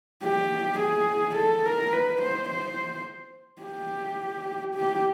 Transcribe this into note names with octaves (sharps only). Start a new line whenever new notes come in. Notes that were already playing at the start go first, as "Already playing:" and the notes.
G4
G#4
A4
A#4
B4
C5
C5
G4
G4